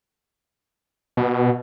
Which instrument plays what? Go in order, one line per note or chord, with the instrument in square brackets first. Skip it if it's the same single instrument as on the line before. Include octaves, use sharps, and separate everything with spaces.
[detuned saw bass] B2